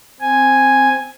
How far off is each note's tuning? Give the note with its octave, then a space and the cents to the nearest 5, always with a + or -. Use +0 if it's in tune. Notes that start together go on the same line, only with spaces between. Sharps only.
C4 +0 G#5 +0